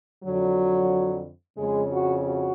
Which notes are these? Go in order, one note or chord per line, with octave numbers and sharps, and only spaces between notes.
F2 D3 F#3
F2 C#3 G#3
F#4
F#4